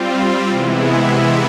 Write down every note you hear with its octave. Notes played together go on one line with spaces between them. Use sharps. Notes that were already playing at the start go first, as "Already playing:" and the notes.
Already playing: G3 C4 F4
C3 E3 G#3 B3 E4